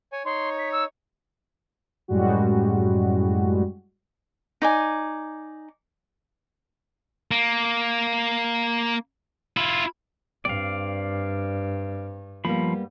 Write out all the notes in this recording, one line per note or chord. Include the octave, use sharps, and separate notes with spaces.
C#5 G#5
D#4 C#5 C6
B6
E6
F#2 A2 G3 G#3 F#4
D#4 D5 G#5
A#3
E4 F4
G2 C4 D5 F5
F3 G3 A#3 B3 B5